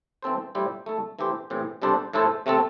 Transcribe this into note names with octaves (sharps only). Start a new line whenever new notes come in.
E3 C4 A4 C5
A2 G3 E4 G4 C5
A3 E4 A4
E3 A3 E4 G4 C5
A2 E3 C4 G4
C3 G3 D4 A4 C5
A2 A3 E4 A4 C5
C3 A3 C4 A4